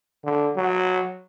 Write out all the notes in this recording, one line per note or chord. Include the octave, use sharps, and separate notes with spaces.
D3
F#3